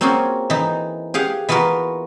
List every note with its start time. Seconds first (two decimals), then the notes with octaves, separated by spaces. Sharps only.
0.01 A#3 C4 C#4 F4 F#4 G#4
0.50 E3 D#4
1.14 G4 G#4 F5 F#5
1.49 E3 B3 F4 F#4 A#4 B4